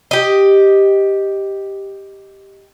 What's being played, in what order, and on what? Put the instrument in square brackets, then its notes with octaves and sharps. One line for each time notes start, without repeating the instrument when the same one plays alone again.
[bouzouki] G4 D#5